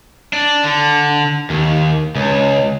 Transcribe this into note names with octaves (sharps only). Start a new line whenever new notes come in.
D4
D3
D#2
C#2